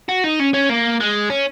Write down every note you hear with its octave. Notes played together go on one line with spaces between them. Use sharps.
F#4
D#4
C#4
C#4
A#3
G#3
C#4